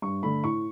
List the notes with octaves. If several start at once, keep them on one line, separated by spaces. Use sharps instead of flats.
G2 C#6
D3 A3 B5
A2 C#6